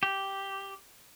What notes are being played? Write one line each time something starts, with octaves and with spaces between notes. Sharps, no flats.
G4